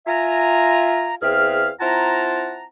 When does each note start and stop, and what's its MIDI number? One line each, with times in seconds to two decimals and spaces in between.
0.07 1.15 65
0.07 1.15 76
0.07 1.15 80
0.07 1.15 82
1.22 1.69 40
1.22 1.69 60
1.22 1.69 68
1.22 1.69 76
1.22 1.69 77
1.22 1.69 89
1.80 2.64 60
1.80 2.64 64
1.80 2.64 65
1.80 2.64 78
1.80 2.64 81
1.80 2.64 82